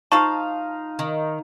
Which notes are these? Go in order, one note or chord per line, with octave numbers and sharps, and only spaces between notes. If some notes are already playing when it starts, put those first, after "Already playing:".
F3 D#4 F4 F5 A5 C#6
D#3